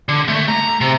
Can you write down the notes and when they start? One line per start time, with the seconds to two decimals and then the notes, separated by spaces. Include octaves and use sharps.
0.09 D3
0.28 A3
0.48 A#5
0.81 C3